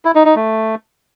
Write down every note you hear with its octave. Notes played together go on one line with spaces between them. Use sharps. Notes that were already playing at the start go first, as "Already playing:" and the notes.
E4
D#4
D#4
A3